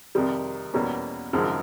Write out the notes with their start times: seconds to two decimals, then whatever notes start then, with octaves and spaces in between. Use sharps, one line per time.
0.15 F2 C3 D#3 G3
0.73 E2 B2 G3 A#3 C#4
1.33 G#1 F#2 C#3 F3 G#3